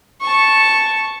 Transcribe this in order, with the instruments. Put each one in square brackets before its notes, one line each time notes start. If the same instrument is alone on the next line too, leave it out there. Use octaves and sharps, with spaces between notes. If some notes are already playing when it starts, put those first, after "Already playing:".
[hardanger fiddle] A5 C#6